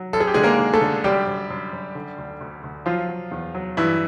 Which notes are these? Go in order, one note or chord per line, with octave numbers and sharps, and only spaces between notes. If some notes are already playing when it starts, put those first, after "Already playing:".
Already playing: F#3
F#2 A4
G#4
G4
D3 G#3 G#4
A#3 A#4
D3
A3 A4
D3
F#2 G3 G4
F#2
F#2
F#2
D3
D2
D2
D2
F3 F#3 F4
F#3
E2
F#3
G2 E3 E4